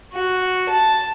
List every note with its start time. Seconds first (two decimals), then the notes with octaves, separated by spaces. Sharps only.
0.13 F#4
0.69 A5